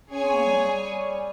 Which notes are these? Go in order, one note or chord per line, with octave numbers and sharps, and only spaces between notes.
C#4 G#4 C#5 G#5
C4
A#3
G3
G3